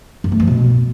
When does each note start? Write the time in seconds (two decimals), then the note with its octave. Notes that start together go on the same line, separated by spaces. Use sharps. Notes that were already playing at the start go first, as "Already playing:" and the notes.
0.24 F#2
0.32 A3
0.40 F3
0.47 B2